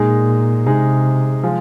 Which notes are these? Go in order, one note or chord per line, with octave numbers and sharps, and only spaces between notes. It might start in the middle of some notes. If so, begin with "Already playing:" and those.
Already playing: A#2 G#3 D#4 G#4
C3 G#3 D#4 G#4
F3 G#3